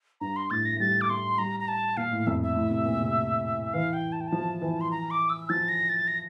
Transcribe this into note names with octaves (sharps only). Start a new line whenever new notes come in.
G2 A#5
C6
A2 A6
A#6
A3
G3 A6
D6
A3 C6
G3 A#5
A#5
A5
A#2 F5
A2
F2 E5
E5
A2
C3
A#2
C3
E3 F5
G5
A5
G5
F3 A5
E3
C6
A#5
D6
E6
F3 A6
A#6
A6
A#6